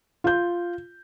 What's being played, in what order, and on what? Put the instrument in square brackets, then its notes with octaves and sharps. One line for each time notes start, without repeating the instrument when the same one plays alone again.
[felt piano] F4 G6